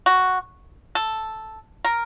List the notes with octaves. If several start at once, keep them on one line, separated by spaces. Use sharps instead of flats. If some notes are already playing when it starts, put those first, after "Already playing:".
F#4
A4
A#4